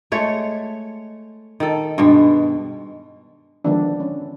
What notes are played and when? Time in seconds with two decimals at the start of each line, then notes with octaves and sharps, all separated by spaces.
0.12 G#3 A3 C#5
1.60 D#3 A4
1.98 G2 B2 G#3
3.64 D3 D#3 F3 G#3 B3 D4
4.00 C#4